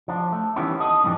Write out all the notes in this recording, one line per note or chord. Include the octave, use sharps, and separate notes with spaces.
F3 D4
A3
D#3 E3 G3 B3 C#4 E4
A4 D#5
F2 G#2 E3 G3 B3 D4